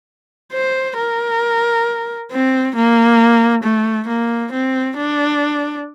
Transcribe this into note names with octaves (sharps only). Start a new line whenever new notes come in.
C5
A#4
C4
A#3
A3
A#3
C4
D4